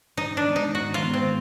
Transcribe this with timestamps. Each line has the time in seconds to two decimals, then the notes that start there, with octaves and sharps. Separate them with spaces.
0.17 G#2 D#4
0.37 D4
0.46 D#3 G#3 B3
0.56 D#4
0.74 G#2 F#4
0.94 F4
1.04 D#3 G#3 B3
1.14 C4